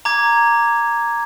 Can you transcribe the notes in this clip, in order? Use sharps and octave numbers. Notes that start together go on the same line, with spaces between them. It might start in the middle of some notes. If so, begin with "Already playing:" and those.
A#5 D6 G#6